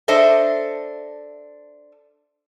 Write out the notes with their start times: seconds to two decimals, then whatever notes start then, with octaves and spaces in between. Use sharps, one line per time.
0.08 D4 A4 C5 D#5 E5